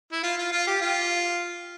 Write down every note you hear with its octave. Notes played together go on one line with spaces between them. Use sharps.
E4
F4
F4
F4
G4
F4